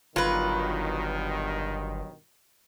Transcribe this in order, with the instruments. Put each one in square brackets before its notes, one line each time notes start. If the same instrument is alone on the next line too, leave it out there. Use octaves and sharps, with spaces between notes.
[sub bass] G1 [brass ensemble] G2 B2 D#3 [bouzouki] F#3 B4 [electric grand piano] F4